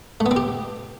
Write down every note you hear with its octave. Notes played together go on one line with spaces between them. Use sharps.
A3
B3
C4
G4